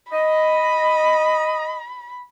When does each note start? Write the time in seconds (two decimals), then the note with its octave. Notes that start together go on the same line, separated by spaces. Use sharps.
0.13 D#5 B5